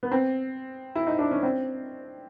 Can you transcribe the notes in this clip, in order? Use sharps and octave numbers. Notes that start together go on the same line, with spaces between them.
B3
C4
E4
D#4
D4
C#4
C4